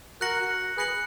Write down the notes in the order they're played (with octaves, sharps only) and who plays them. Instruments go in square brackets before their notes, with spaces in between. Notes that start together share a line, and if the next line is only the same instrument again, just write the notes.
[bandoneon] F#4 A#4 [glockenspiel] F#6 A#6 C#7 F#7
[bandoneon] G#4 B4 [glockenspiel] F#6 A#6 C#7 F#7